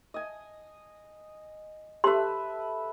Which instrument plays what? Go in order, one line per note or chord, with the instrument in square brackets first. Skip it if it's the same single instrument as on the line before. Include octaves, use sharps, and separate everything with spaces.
[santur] D#5 G#5
[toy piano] G4 C6 [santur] A4 B4 E5